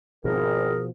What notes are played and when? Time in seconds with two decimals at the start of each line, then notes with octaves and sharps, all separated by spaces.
0.25 G#1 B2 F3 G#4 A#4